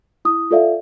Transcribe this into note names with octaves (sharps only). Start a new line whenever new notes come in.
E4 D#6
F4 A4 D5 E5 F5